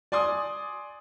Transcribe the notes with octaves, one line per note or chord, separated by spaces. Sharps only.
D5 G#5 C6 D#6